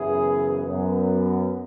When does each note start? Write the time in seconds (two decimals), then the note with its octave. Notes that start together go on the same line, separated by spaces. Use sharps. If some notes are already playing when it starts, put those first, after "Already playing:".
Already playing: F#2 C#3 E3 B3 E4 G#4
0.66 F#2 F#3 B3